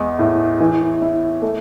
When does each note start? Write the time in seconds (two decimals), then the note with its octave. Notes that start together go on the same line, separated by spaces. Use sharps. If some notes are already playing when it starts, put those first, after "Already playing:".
Already playing: E2 G#3
0.19 A2
0.60 E3
1.02 E4
1.42 A3